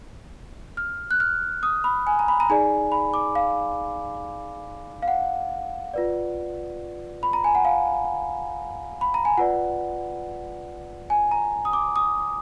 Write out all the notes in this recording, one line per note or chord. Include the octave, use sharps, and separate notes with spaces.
F6
F#6
F6
D#6
B5
G#5
A#5
B5
A#5
D#4 G#4 D5 G#5
B5
D6
F5
F5
F#5
F4 B4 D5
B5
A#5
G#5
F#5
F5
B5
A#5
G#5
F4 B4 D5 F#5
G#5
A#5
D#6
D6
D#6